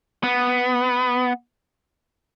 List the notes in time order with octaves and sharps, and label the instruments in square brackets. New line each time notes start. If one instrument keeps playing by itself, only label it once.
[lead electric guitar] B3